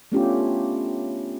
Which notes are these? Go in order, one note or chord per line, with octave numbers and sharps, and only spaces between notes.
A3 B3 C#4 D4 F4 G4